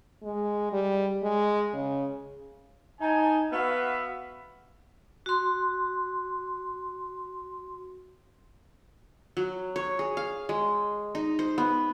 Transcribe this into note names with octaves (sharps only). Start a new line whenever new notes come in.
G#3
G3
G#3
C#3
D#4 G#5 A5
B3 F#4 B4 E5 F5
F#4 C6
F#3
C#5
G#4
F5
G#3
D#4
C5
B3